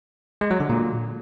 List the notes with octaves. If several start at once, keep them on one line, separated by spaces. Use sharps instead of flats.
G#3
F#3
D3
A#2